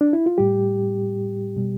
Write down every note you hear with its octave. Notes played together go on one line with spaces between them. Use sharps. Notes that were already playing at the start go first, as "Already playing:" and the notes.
D4
E4
F4
A2 G3 G4
B2 G3